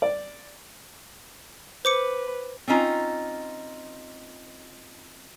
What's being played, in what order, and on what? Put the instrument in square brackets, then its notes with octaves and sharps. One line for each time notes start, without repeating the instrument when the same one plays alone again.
[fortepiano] D5
[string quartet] B4 [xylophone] C5 D6 C#7
[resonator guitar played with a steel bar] C4 C#4 D#4 F4